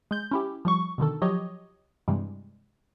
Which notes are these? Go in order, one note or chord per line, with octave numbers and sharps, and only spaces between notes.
G#3 G6
C#4 E4 G4
F3 G3 C#6
B2 D3 D#3 A4
F3 F#3 G4 C#5 D#5
G2 C3 E3 G3 G#3